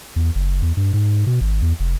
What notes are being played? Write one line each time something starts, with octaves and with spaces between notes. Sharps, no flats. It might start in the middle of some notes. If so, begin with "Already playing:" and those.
E2
F#1
E2
G2
G#2
B2
G#1
E2
F1